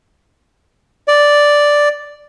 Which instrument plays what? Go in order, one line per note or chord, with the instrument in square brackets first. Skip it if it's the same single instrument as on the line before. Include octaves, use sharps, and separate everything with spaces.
[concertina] D5